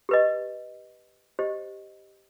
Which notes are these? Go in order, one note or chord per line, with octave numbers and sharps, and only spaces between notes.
G4 B4 D#5
G4 C5 D#5